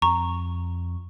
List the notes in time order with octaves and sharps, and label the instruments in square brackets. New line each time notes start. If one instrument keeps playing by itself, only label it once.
[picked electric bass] F2 [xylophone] A#5 C#6